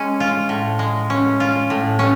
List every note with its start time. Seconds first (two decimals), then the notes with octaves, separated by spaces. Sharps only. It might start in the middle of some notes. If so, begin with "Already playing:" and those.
Already playing: G#3 C#4
0.20 F4
0.49 A2
0.79 G#3
1.10 C#4
1.40 F4
1.70 A2
1.99 C#4